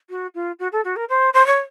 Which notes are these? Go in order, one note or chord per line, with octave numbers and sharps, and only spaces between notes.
F#4
F4
F#4
A4
F#4
A#4
C5
C5
C#5